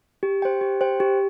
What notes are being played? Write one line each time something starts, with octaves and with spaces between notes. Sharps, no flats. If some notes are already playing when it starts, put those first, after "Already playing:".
G4
C5 G5
G4
C5 G5
G4